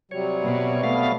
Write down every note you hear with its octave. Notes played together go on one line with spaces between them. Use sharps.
C3 F#3 G3 C#5
B2
A3 B3 F5